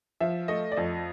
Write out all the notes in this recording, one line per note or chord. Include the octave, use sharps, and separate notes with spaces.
F3 E5
A3 D#5
D5
F2 D#5